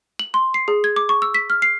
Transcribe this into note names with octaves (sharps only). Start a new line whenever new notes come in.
F#7
C6
C7
G#4
G#6
D6
C#6
E6
B6
F6
C7